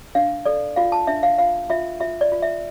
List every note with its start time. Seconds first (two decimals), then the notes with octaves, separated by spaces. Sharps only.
0.15 D4 F5
0.45 A4 D5
0.76 F4 F5
0.92 A5
1.07 D4 E5
1.23 F5
1.38 F4 F5
1.69 F4 E5
2.00 F4 E5
2.21 D5
2.32 F4
2.42 E5